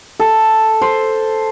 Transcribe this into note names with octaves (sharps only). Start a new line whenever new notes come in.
A4
C5